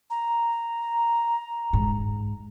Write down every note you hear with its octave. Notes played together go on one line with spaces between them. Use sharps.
A#5
G#2